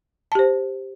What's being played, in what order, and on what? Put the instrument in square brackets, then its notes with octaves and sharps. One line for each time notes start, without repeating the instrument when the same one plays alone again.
[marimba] A5
G4
C5